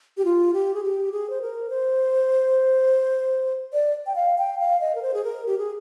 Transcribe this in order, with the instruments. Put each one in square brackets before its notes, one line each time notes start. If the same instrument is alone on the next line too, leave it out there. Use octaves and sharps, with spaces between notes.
[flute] G4
F4
G4
G#4
G4
G#4
C5
A#4
C5
D5
G5
F5
G5
F5
D#5
A#4
C5
G#4
A#4
G4
G#4